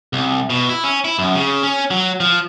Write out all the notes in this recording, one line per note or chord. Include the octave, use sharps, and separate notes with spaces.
C2
B2
E4
C#4
E4
F#2
C#3
C#4
F#3
F3